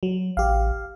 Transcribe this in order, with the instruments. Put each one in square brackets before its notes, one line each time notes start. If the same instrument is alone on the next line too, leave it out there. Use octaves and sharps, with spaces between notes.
[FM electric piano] F#3
[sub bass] A1 [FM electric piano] G4 F5